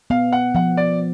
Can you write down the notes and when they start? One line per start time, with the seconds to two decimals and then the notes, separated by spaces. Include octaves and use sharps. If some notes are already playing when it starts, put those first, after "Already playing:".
0.10 B3 F5
0.33 F#5
0.55 F3 F#5
0.77 D5